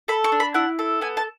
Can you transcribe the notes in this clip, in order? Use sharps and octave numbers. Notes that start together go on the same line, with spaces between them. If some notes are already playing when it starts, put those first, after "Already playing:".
A4 B5
C#6
D4
B5
E4 F#5
A4
B3 G#5
A5